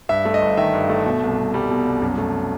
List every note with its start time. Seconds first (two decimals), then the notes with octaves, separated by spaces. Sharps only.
0.09 G2 E5
0.25 A3
0.34 D#5
0.42 G1
0.57 D#3 E5
0.74 G2
0.90 A3
1.06 B2
1.22 C2
1.38 C2
1.54 G3
1.70 B2
1.85 C2
2.02 F#2
2.18 A3